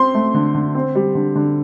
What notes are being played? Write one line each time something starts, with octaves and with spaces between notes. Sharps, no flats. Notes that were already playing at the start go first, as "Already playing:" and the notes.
Already playing: C4 C6
A3
D3
D3
C4
G3
D3
D3